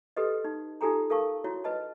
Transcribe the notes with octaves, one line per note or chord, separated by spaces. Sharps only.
G4 A4 B4 D#5
D#4
D#4 F4 G4 A4 G#5 A#5
A4 A#4 F5 A5 C#6
E4 F#4 C#5
B4 D#5 A5